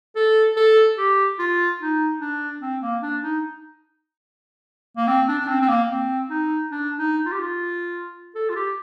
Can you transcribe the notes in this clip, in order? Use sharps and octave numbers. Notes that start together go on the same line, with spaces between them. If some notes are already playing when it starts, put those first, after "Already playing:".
A4
A4
G4
F4
D#4
D4
C4
A#3
D4
D#4
A#3
C4
D4
D4
C4
C4
A#3
C4
D#4
D4
D#4
F4
G4
F4
A4
F4
G4